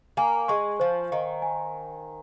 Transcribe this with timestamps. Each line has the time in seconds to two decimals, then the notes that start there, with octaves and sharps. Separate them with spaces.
0.17 A#3 G#5
0.48 G#3 C#6
0.80 F3 C5
1.12 D#3 F5
1.42 G#5